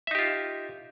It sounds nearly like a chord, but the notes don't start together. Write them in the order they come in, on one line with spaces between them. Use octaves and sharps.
E5 D#4 G4 F4